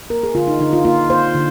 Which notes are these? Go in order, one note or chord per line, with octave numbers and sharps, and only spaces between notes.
A#3 A#4
G#4
D3 F4
D#4
D3 D#4
F4
A#3 F4
A#3 C5
D3